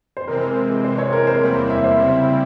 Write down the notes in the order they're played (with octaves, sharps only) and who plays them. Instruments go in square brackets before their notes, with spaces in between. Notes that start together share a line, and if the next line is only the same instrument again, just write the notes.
[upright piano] C5
[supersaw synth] C3 E3 G#3 C4 [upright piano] A#4
[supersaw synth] C3 E3 G#3 [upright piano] C5
[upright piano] C#5
A#4
C5
[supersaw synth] E2 C3 G3 A#3 E4
[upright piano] E5
C5
[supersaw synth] C#3 G3 C4 E4